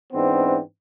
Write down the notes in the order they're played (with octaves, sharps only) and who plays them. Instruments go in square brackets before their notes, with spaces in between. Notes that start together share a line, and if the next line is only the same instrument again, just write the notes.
[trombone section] G#2 E3 B3 C4 D4